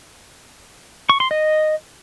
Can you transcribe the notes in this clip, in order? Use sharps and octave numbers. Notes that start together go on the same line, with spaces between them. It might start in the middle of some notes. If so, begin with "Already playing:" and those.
C#6
C6
D#5